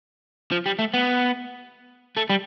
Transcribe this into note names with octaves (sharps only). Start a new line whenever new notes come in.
F3
G3
A3
B3
A3
G3